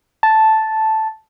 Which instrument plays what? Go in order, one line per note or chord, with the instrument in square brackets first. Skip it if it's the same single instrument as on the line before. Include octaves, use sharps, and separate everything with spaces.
[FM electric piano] A5